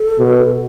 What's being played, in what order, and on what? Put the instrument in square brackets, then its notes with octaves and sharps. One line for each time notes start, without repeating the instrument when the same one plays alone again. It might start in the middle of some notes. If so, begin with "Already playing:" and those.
Already playing: [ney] A4
[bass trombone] B2